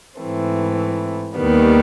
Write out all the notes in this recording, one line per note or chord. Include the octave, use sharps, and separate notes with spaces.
G#2 E3 A3 C4
D#2 D#3 G3 B3